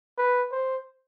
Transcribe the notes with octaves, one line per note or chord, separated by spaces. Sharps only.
B4
C5